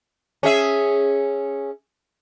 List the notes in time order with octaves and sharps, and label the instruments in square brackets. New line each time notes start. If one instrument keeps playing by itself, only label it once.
[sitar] C#4 G#4 E5